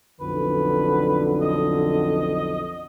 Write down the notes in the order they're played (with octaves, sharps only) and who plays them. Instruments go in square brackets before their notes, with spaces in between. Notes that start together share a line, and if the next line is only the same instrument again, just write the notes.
[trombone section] B1 F2 D3 [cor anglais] B4
[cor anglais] D#5